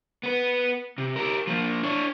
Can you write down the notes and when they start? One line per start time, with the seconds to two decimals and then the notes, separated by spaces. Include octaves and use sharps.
0.23 B3 B4
0.98 C3
1.16 G4 A#4
1.47 F3 A#3
1.83 D4 C#5